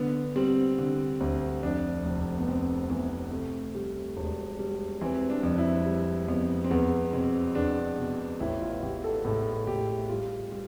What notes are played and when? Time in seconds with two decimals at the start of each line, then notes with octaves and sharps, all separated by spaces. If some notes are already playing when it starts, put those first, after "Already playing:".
Already playing: D3 B3
0.36 G3 C4
0.79 D3
1.21 D2
1.63 F2 D4
2.05 F1
2.38 B3
2.47 F2 C4
2.90 E3 B3
3.32 C3 A3
3.75 G3
4.17 E1
4.59 G3
5.01 E3 C4
5.30 D4
5.43 F2
5.58 E4
5.86 G3
6.28 F2 B3
6.64 C4
6.71 E2 B3
7.13 B2 C4
7.55 E2 D4
7.98 B2
8.40 A1 E4
8.61 F4
8.82 A1 G4
9.04 A4
9.25 A2 A4
9.67 A2 G4
10.09 G3 F4
10.52 G3